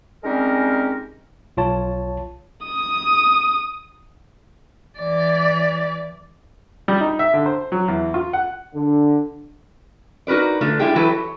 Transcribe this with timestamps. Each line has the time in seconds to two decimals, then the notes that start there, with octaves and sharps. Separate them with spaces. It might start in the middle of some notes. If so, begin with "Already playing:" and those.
0.24 G3 G#3 C4 C#4 D#4 A#4
1.57 B1 F4 C#5 A5
2.65 D#6
4.99 E3 D5
6.88 G3
7.01 D#4
7.19 E5
7.34 D3
7.46 C5
7.72 F#3
7.88 E2
8.14 F4
8.33 F#5
8.74 D3
10.27 D#4 F#4 A#4 B4 D5
10.61 D3 A3 F4
10.79 G#3 E4 F4 G4 G#4
10.96 E3 F#3 E4 G4 A4 B4
11.09 C#5